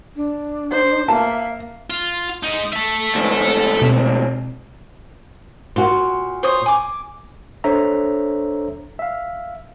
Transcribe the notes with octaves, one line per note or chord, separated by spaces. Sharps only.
D4
C5
A#3 E5 A5
F4
G#3 D#4
A4 E5
D2 G#2
B2 C4
A#2 F#4 C6
C5 C#5 D#6
G#5 D6
D4 A4 C5 C#5 E5 A#5
E5 F5